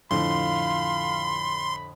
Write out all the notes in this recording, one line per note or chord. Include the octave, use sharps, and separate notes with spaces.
F2 A2 D3 F5 B5 C6